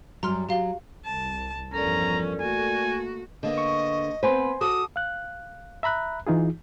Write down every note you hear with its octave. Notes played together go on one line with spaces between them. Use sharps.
F#2 F#3 G3 A#5 C6 F6
F#3 G4 F5 G7
C2 A5
E2 G2 F3 C#4 A4 A#4 D5 A#5
A3 A#3 F#4 G#5
D3 A#3 B3 D#5
C#6
B3 C4 B4 C5 G#5 C6
F#4 A4 D6 D#6
F5 F#6
E5 A#5 B5 F#6
E3 D#4 F4 G#4